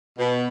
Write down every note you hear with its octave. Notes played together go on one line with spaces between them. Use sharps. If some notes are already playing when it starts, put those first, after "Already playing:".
B2